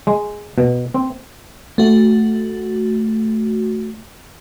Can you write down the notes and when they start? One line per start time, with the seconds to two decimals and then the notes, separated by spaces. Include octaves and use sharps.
0.07 G#3
0.58 B2
0.94 C4
1.78 A3 F#4